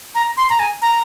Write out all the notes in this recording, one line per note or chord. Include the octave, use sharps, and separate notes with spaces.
A#5
C6
A#5
G#5
A#5